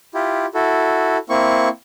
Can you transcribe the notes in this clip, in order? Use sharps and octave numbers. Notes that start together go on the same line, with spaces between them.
E4 F4 G4
E4 F#4 A4
A#3 C4 E4 C#6